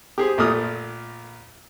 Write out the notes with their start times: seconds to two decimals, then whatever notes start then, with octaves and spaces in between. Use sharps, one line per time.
0.18 G4 G#4 C5
0.38 A#1 A#2 A3 D#6 F6